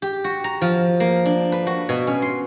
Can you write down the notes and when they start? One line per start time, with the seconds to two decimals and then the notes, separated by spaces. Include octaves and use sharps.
0.02 G4
0.24 F#4
0.44 A#5
0.61 F3
1.00 A#3
1.25 D4
1.52 B4
1.67 F#4
1.89 B2
2.07 C#4
2.22 C6